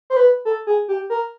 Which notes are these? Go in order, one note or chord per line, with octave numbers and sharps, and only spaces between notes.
C5
B4
A4
G#4
G4
A#4